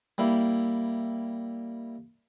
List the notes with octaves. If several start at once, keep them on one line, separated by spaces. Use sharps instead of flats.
G3 A#3 E4